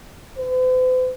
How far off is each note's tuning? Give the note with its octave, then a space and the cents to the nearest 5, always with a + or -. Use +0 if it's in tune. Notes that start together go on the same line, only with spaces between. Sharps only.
C5 -45